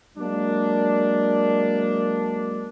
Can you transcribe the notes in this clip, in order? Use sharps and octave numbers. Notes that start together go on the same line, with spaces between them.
F#3 G#3 A#3 D4